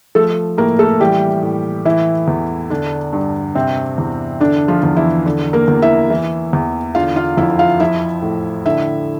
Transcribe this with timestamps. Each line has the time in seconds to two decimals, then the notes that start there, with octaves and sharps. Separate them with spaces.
0.15 F3 A3 A4
0.57 A2 A#3 A#4
0.79 A3 A4
1.00 E3 G3 G4
1.42 A2
1.85 E3 E4
2.28 E2
2.70 D3 D4
3.13 G2
3.55 C3 C4
3.98 E2
4.40 D3 D4
4.68 F3 F4
4.83 E2
4.96 E3 E4
5.26 D3
5.53 A#3 A#4
5.68 E2
5.82 E4 E5
6.10 E3
6.53 E2
6.95 D3 F4 F5
7.16 F4 F5
7.37 F2 E4 E5
7.59 F4 F5
7.80 F3 E4 E5
8.22 A2
8.65 D3 E4 E5